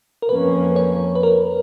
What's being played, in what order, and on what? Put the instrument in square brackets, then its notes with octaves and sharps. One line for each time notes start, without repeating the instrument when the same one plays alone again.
[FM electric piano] A#4
[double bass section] F2 F3 A#3 C#4 [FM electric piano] B4
[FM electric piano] C#5
B4
A#4